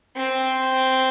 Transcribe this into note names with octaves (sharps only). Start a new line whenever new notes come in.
C4